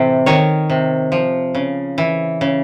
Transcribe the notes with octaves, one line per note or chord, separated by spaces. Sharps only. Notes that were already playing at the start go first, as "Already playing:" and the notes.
Already playing: A2 C3 E3
D#3 C#5
C3
F3
C#3
E3
C#3